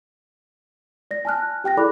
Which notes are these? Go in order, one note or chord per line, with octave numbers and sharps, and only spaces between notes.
D5 A#6
G#5 A5 F6 F#6
G4 G5 F#6 A#6
E4 G#4 A4 D5 B5 D6